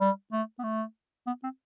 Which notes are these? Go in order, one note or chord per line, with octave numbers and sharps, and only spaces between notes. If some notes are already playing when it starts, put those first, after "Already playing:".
G3
A3
B3
A3
B3
C4